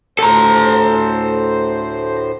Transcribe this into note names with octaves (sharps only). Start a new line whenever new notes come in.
D2 A2 A4 C5 A#5